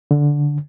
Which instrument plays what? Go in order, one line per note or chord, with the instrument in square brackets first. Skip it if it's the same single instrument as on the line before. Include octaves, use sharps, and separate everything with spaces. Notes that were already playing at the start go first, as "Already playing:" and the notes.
[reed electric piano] D3